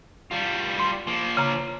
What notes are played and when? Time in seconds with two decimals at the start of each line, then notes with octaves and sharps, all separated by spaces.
0.31 G3 F4
0.79 C6
1.07 F3 A#3
1.37 C#3 A#5